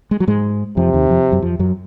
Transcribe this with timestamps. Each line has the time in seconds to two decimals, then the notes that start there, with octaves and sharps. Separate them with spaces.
0.11 G#3
0.20 F#3
0.27 G#2 G#3
0.77 F2 C3 F3
0.94 D#2 D#3
1.10 F2 F3
1.32 F#2 F#3
1.42 F2 F3
1.59 F#2 F#3